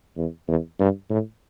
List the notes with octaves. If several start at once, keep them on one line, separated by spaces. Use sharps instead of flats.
E2
E2
G2
A2